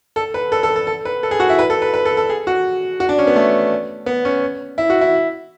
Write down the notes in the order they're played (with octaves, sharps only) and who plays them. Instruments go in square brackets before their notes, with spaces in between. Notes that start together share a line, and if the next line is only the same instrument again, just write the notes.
[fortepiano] A4
B4
A4
A4
A4
A4
B4
A4
G#4
F#4
E4
B4
A4
B4
B4
A4
A4
G#4
F#4
F#4
D4
C#4
B3
A3
B3
C#4
E4
F#4
E4